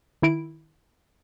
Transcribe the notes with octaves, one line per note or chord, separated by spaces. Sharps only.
D#3 E4 D7